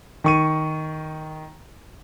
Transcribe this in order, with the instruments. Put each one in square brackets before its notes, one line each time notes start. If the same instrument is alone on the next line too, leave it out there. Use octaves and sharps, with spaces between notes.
[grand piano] D#3 C#6 D#7